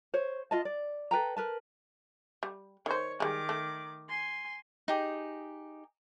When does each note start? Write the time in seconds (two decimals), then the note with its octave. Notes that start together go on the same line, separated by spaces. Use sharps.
0.14 C5 C#5
0.51 F4 D#5 A5
0.65 D5
1.11 A4 B4 G5 A#5
1.37 A#4 B4 A5
2.43 G3
2.86 D#3 C5 C#5
3.20 D#3 G3 G#3 D6
3.49 A3
4.09 G#5 C6
4.88 D#4 G4 G#4